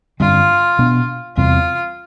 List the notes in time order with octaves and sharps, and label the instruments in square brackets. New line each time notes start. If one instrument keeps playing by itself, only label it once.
[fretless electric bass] G2 D3 G3 C4 [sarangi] F4
[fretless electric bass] B2 B3 D4
[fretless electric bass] E2 C3 G3 C4 [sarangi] F4